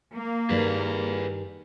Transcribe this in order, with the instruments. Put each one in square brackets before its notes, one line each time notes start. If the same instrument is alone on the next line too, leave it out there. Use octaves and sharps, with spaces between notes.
[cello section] A#3
[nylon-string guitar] G2 D#3 G3 [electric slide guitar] G#4 B4